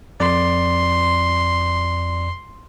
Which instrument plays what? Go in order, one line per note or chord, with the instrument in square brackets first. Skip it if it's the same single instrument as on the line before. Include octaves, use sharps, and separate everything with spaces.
[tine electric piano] F2 D5 [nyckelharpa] C6